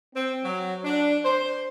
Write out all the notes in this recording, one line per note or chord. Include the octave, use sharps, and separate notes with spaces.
C4
F#3
D4
C5